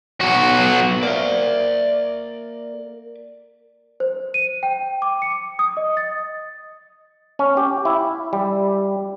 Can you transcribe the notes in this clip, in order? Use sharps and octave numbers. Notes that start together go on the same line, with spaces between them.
B1 F#4
A#3 A#4 D5 E5
C5
D#7
G5
D6
C#7
D#6
D#5
A6
C#4
G4
E4
G3